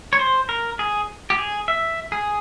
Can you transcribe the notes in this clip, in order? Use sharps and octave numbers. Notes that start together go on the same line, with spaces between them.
C#5
C5
A#4
G#4
G4
G#4
E5
G#4